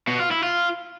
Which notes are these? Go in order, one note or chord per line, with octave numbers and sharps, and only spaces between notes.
B2
F4
E4
F4